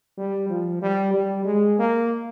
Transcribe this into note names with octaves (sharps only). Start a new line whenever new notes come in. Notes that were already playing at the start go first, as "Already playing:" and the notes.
G3
F3
G3
G3
G#3
A#3